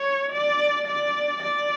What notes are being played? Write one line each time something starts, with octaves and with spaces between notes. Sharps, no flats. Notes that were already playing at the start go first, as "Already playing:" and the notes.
Already playing: C#5
D5
D5
D5